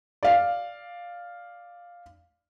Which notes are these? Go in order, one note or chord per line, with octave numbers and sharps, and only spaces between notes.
D5 F5